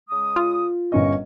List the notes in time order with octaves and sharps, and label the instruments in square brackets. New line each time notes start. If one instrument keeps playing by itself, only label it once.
[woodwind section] C#3 G#3 D#6
[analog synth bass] F4
[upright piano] G1 C#4 D#5 [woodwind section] D#2 A#4 C#6